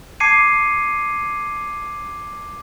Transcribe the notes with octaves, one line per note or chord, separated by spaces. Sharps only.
A5 D6 G#6 C7 C#7 D#7